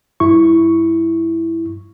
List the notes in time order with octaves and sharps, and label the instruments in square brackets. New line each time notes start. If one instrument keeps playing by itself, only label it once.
[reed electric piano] G2 E4 C#6